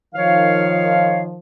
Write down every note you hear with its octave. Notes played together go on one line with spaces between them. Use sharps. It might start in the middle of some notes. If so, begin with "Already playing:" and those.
D#3 F3 C#5 F5